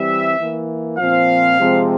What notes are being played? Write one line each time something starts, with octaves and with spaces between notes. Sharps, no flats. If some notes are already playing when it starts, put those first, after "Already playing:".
Already playing: E3 G3 C4 E5
E3 A#3
A#2 F3 C4 F5
C3 F3 G#3 C4